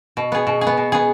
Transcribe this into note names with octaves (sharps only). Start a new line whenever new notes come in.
B2
B3 G#4
B2
G#4
B3
B2
B3 G#4